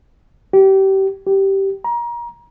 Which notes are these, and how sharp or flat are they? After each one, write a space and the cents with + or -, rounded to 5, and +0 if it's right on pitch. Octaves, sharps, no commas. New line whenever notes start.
G4 -25
G4 -10
A#5 +30